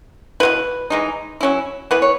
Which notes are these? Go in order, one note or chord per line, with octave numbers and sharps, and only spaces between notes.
B2 A3 E4 B4
E3 G#3 D#4
F#3 C#4 E4
E3 B3 E4 B4
C#5